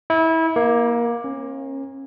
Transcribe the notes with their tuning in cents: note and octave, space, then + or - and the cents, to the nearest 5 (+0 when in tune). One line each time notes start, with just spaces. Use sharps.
E4 -25
A#3 +20
C#4 -35